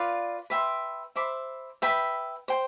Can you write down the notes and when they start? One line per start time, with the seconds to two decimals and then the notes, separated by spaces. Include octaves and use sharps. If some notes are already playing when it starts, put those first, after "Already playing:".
Already playing: F4 B4 D5 F5
0.50 B4 E5 G5 C6
1.16 C5 E5 B5 D6
1.82 B4 E5 G5 B5
2.48 C5 G5